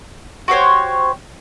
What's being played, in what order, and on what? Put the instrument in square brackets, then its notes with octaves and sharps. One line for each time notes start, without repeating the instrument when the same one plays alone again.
[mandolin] F#4 G4 C5 C#5